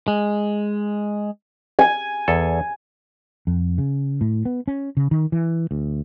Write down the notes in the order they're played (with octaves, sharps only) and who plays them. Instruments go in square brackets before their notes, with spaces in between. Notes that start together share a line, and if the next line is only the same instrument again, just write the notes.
[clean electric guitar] G#3
[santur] G#5
[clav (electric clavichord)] E2 A4
[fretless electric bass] F2
C#3
A2
B3
C#4
C#3
D#3
E3
D2